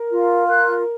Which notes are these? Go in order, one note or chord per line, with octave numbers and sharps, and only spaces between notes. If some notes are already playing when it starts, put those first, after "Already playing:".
Already playing: A#4
F4
A#4 F#6